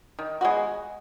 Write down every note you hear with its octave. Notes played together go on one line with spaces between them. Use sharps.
D#3
G#3 B3 F#4